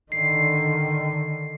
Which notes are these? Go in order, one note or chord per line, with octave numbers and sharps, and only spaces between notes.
D3 D#3 C7